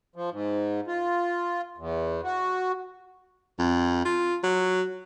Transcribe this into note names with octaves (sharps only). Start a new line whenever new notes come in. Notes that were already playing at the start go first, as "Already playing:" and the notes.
F3
G#2
F4
E2
F#4
F2
F4
F#3